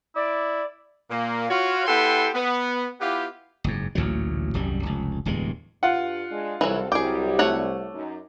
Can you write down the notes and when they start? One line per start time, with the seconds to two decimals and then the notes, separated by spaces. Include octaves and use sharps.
0.16 E4 D5
1.11 A#2 A#3
1.49 F4 F#4 C#5
1.87 B3 E4 G4 A4 G5 C6
2.34 B3
3.01 B3 E4 F4 G4
3.64 F#1 G#2
3.95 A1 D2 A#2 F#3
4.54 D#1 C2 F#2 G3
4.83 F1 C#2
5.25 D1 E2 G2 G#3
5.83 G2 F4 F#5
6.30 G#3 D4
6.61 C2 C#3 E3 F#3 C4 A4
6.92 C2 F#3 G3 G#4 G5 D6
7.39 A3 C#5 F#5
7.94 F#2 D#4